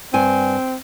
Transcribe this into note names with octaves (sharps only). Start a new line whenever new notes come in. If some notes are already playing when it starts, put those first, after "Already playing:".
G2 C4 G#5